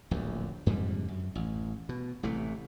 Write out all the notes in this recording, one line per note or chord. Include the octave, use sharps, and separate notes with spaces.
D1 A#1 D#2
F2 G#2 D3 G3
F#2
A1
B2
A1 C3 E3 A3